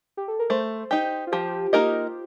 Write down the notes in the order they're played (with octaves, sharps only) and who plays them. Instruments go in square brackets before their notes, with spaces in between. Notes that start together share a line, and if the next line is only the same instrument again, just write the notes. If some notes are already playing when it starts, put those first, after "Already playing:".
[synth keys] G4
A4
A#4
[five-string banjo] A3 [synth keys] C5
[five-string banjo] D#4 G4
[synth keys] F4
[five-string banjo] F3 [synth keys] G4
[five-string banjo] A#3 D#4 A#4 D#5 [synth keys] G4